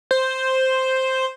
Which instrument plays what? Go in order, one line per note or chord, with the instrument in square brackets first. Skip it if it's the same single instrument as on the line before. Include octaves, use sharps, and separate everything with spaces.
[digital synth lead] C5